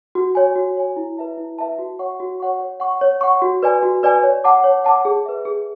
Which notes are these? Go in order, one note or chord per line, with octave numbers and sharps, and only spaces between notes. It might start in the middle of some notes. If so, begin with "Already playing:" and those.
F#4
C#5 G#5
F#4
C#5 G#5
E4
B4 E5 A5
E4
B4 E5 A5
F#4
C#5 F#5 C#6
F#4
C#5 F#5 C#6
C#5
F#5 C#6
C#5
F#5 C#6
F#4
B4 D5 G#5
F#4
B4 D5 G#5
C#5
F#5 A5 D6
C#5
F#5 A5 D6
G#4
B4 E5
G#4